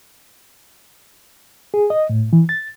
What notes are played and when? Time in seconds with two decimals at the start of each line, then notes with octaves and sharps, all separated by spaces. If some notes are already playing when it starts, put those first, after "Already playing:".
1.74 G#4
1.90 D#5
2.10 A2
2.33 E3
2.49 A6